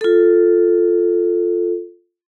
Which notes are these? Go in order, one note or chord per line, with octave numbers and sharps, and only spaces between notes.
F4 A4